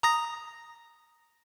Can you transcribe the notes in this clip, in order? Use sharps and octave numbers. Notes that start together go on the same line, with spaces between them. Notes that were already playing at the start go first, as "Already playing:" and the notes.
A#5 D#6 A#6